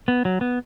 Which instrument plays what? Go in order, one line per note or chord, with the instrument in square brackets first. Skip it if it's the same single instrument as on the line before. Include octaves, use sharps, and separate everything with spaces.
[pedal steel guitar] B3
F#3
B3